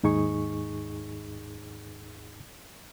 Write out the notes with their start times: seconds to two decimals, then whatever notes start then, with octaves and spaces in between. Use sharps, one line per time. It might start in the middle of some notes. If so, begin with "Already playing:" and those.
0.03 D#2 G#2 D#4 G#4 C#6